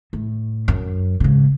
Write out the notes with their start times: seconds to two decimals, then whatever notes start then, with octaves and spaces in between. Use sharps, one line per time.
0.13 A2
0.68 F#2
1.20 G#2 C#3